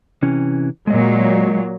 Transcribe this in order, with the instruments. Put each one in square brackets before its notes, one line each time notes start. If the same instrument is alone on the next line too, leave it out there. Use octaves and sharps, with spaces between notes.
[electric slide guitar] C3 E3 C#4
[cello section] A#2 F#3 [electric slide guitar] G#3 D#5